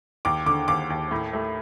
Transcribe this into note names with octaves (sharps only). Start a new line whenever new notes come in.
D#2 D6
D3 D6
D#2 D6
D#2
A2
A3